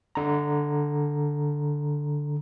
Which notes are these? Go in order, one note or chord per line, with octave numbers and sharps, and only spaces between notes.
D3 A#5